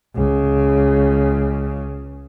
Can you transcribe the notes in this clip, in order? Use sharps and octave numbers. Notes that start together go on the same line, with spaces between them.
C#2 C#3